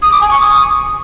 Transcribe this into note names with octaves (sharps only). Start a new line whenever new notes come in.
D#6
D6
G#5
C#6
D#6